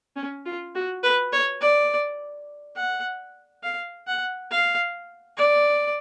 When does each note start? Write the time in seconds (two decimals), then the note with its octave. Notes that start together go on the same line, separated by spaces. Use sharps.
0.16 C#4
0.45 F4
0.75 F#4
1.03 B4
1.32 C#5
1.61 D5
2.76 F#5
3.63 F5
4.07 F#5
4.50 F5
5.37 D5